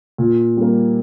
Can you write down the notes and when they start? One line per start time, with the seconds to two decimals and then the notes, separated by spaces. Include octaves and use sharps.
0.18 A#2
0.57 G3 A#3